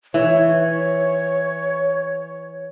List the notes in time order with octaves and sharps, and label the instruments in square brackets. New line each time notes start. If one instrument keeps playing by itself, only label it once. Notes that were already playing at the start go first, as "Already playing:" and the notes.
[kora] E3 [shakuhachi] C#5